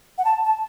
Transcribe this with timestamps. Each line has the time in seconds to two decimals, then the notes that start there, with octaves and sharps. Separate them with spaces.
0.18 F#5
0.25 A5
0.45 A5